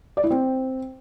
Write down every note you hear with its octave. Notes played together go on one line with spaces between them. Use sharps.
D5
E4
C4